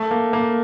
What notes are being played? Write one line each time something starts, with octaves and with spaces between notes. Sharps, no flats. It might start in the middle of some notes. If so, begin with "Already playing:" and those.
Already playing: A3
A#3
A#3